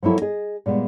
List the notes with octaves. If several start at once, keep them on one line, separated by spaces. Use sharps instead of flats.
F3 F#3 A#3 E4 A4
G#4 D#5
A#2 G3 G#3 B3